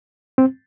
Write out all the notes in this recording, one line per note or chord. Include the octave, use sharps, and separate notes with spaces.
C4